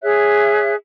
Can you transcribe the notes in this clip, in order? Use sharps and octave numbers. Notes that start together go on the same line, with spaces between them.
G#4 C#5 E5 F#6